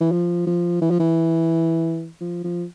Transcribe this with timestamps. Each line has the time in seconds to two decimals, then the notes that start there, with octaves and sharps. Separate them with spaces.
0.01 E3
0.12 F3
0.47 F3
0.82 E3
0.90 F3
1.00 E3
2.21 F3
2.44 F3